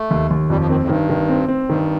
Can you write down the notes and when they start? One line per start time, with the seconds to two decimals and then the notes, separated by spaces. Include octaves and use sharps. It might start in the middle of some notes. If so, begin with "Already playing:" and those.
Already playing: A3
0.10 D#2
0.30 D#2
0.50 F2 G3
0.60 F3
0.69 D#3 C4
0.80 F2
0.85 A2
0.89 G2 D#3
1.09 D#3
1.29 C4
1.48 C4
1.68 G2 D#3